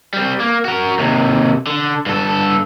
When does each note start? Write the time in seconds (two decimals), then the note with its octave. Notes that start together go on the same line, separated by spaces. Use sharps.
0.14 G3 C4
0.40 A#3
0.65 F#4 A#4
0.99 D#2 C3
1.67 D3
2.06 G2 A4